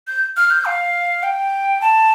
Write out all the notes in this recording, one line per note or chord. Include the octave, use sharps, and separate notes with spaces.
G6
F6
G6
F5
G5
A5